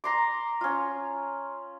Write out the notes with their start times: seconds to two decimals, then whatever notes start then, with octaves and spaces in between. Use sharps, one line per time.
0.04 A#5 C6 D6
0.61 C#4 F4